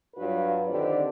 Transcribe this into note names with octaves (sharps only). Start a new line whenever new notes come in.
G2 F#3 F4 B4
D3 D#3 C4 G4 D5